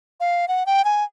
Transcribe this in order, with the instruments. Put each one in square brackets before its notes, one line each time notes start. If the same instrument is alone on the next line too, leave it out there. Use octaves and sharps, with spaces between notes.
[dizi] F5
F#5
G5
G#5